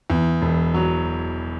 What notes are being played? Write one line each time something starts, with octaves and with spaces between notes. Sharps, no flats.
E2
E1
F#3